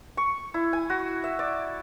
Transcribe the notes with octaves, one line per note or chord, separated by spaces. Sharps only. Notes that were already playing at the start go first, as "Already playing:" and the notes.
C#6
E4
G#5
F#4
E5
D5